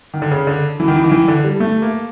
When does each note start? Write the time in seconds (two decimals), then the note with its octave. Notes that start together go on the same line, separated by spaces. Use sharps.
0.14 D#3
0.22 D3
0.31 C#3
0.47 D3
0.80 E3
0.88 D#3
0.96 E3
1.04 D#3
1.11 E3
1.28 D3
1.44 G3
1.60 A3
1.82 A#3